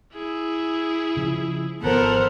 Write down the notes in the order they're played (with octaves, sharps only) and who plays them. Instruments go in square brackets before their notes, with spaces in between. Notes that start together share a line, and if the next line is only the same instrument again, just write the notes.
[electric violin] E4 G#4
[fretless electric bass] C#3 F3 G#3
[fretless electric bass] G#1 F3 [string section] B3 A4 C5 [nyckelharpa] A#4 [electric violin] F#5 F6